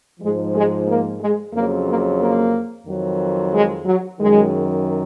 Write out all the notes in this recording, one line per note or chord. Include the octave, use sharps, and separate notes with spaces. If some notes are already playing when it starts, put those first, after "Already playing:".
G#2 F3 G#3
G#3
A#3
G#3
F2 C#3 F#3 A#3
A#3
A#3
F2 D#3 F#3
G#3
F#3
F#2 D#3 F#3 G#3